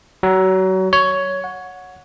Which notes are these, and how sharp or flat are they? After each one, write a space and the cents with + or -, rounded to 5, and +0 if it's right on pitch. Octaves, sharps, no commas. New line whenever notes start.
F#3 +30
C#5 +10
F#5 -20